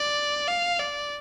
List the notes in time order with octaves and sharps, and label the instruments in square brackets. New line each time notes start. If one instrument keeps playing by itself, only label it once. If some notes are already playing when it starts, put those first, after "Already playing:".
Already playing: [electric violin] D5
F5
D5